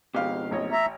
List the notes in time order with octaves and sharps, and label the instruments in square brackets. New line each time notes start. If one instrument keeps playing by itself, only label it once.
[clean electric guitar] F2 B2 [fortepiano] G4 F5
[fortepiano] A1 C#5 D#5
[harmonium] E5 A#5